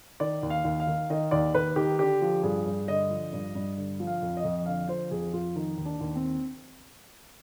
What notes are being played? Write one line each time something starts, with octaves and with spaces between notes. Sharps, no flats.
D#3 D5
D#2
F5
D#2
F5
D#3
D#3 D#5
D#2 D5
D#2 B4
D#3 G4
D3 G4
F3
G2 G#4
G2
D3 D#5
F3
G2
G2
D3
F3
F5
F2
D#5
F2
D3 F5
F3 C5
F2 G#4
F2 F4
D#3 D#4
D#2
D4
D#2
C4